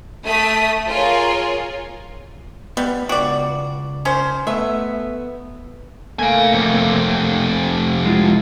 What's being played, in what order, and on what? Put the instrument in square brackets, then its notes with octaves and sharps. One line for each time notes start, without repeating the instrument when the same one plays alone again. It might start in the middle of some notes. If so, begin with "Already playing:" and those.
[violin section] A3 D#6 B6
F4 G#4 A#4 C#5
[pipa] G3 [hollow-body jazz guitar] B3
[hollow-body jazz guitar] C#2 G5 [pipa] F#4 D5
[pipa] C#4 C5
[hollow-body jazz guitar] A3 B3 D#5 [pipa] E5
[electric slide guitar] A3 A#3 [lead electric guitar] F5 G#5
[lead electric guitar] F2 C3
[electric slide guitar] G#3 E4 F4